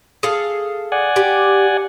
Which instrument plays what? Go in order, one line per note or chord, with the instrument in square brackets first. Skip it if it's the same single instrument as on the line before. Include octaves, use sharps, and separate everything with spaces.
[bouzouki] G#4 A4 F5
[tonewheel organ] D5 F#5 G#5
[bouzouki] G4